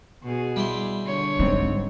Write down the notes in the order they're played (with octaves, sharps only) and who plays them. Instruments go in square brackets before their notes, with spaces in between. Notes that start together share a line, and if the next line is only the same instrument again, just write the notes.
[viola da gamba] B2 G#4
[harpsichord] G3 E4 C6
[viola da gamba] D3 C#5
[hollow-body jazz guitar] G#2 C4 [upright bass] G3